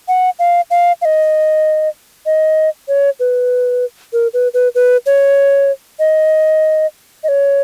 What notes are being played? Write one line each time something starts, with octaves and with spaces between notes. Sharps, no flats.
F#5
F5
F5
F5
D#5
D#5
C#5
B4
A#4
B4
B4
B4
C#5
D#5
D#5
C#5